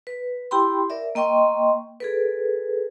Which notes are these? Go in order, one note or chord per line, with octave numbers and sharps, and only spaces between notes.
B4
E4 G4 G5 B5 C6
A#4 D5 E5
A#3 D#5 G5 C6 C#6
G#4 A4 B4